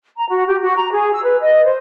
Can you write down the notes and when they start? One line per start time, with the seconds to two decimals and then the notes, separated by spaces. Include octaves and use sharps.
0.16 A#5
0.29 F#4
0.47 G4
0.61 F#4
0.76 A#5
0.93 G#4
1.12 E6
1.24 B4
1.40 D#5
1.65 C5